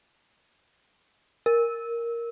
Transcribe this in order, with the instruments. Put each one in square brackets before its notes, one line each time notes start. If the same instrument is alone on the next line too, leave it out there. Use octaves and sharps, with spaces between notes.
[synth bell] A#4